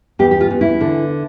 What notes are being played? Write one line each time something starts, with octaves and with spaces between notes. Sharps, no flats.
E2 G4
G4
F4
E2
E4
D3